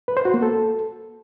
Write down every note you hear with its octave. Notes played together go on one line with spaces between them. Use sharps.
B4
C5
F#4
A#3
A4